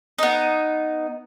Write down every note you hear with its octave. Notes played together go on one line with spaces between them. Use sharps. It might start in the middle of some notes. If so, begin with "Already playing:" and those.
B3 D#4